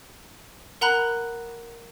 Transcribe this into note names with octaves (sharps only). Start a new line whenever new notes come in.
A#4 F#5 A#5 B5 F#6